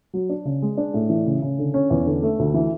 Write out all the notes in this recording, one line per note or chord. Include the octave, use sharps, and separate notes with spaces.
F#3
D4
C#3
G#3
D4
A2
E3
C#3
C#3
D3
C#4
E2
D3
A3
D2
E3